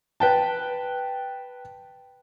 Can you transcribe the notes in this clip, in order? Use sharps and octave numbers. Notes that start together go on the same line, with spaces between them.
B4 G5 A5